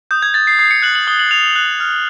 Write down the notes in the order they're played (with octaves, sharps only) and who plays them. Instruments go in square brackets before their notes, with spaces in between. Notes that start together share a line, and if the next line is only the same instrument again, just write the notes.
[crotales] D#6 G6
G#6
G6 A6
C7
D#6 C7
C#7
F#6 F#7
F#7
D#6 G7
F#7
F#6 F7
F#6
F6